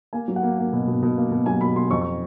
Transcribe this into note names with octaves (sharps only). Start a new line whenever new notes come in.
A#3 G#5
F#3
F#5
A#3
A#3
B2
B2
B2
A#3
B2
F#3 G#5
B2 B5
B2 C6
F2 C#6
C#6